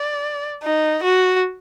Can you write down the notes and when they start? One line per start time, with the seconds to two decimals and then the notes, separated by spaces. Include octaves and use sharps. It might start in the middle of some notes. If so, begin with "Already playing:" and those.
Already playing: D5
0.63 D#4
1.03 F#4